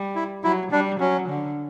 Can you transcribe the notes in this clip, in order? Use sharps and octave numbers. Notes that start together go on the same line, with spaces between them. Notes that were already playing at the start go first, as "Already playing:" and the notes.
Already playing: G3
E4
F#3 E4
G3 D4
F#3 C#4
D3